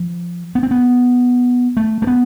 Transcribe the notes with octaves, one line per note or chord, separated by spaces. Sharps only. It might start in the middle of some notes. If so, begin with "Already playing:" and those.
Already playing: F3
B3
C4
B3
A3
A3
B3